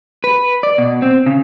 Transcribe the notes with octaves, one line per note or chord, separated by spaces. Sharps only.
B4
D5
B2
C4
C#3